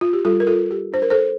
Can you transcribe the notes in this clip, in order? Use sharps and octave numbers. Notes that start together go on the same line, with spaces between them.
F4
G4
G3 F4 A4
A#4
F4 A4
F4
G4
D4 C5
A#4
A4 C5